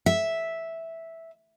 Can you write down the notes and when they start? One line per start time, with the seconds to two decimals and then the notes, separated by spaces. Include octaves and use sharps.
0.06 E5